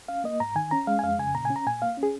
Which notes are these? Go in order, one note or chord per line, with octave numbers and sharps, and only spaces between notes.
C#4 F5
A#3 D#5
G#2 A#5
D#3 G#5
C#4 A#5
G#3 F5
G#5
F2 F5
C#3 G#5
A#2 A#5
G#5
C#4
A#5
A#2 G#5
A#3 F5
C#4
G#4